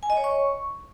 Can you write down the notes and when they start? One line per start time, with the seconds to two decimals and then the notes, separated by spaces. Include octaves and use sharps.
0.03 G#5
0.10 D#5
0.17 C#5
0.24 C#6